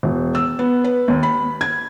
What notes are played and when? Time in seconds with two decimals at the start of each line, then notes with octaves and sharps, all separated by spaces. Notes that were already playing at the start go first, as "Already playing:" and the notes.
0.03 E1
0.35 E6
0.59 B3
0.84 B4
1.08 D#2
1.23 B5
1.61 G#6